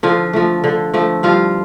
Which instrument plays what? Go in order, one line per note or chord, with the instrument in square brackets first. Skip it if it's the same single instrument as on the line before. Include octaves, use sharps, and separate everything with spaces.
[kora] D3 F3 F4
F3 A3
D3
F3 A3
G2 F3 F4